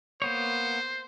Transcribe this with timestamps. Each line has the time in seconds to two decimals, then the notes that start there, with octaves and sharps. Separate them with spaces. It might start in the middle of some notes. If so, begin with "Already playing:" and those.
0.22 A#3 B3 C5 C#5